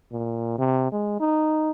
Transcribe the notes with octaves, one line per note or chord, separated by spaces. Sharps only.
A#2
C3
G#3
D#4